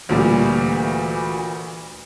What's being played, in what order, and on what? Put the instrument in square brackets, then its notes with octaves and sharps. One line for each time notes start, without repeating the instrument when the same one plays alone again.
[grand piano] D2 A#2 G3 [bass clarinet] E3